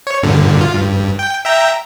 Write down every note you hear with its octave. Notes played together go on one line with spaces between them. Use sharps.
C#5
G2 A#2 D3
F4
G2
G5
E5 G5 A#5